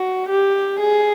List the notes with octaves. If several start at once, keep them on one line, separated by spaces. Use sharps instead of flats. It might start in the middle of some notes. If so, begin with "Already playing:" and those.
Already playing: F#4
G4
G#4